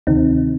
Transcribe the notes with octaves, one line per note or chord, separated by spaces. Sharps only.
D2 C3 D#3 C4 D#4